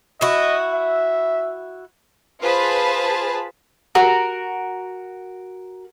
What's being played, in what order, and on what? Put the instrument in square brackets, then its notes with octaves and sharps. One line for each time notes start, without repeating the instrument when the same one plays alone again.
[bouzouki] E4 F#4 [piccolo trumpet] D#5
[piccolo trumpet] E5
[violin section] F4 G#4 B4 C5 A5 B5
[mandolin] F#4 A#4